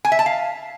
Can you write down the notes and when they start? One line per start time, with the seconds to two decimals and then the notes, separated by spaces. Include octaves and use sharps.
0.05 G#5
0.12 E5
0.19 A5
0.26 F5